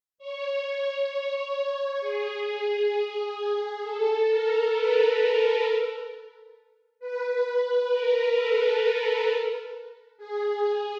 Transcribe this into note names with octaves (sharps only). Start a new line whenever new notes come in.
C#5
G#4
A4
A#4
B4
B4
B4
A#4
A4
G#4